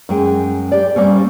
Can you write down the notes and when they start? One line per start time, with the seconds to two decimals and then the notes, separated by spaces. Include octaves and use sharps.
0.09 F#2 G#3 G5
0.72 G4 D5
0.96 G3 A#3 C4 C#4